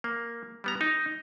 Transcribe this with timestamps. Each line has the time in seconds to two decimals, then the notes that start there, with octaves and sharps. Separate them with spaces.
0.04 A#3
0.64 G3 B3 A#5
0.81 D#4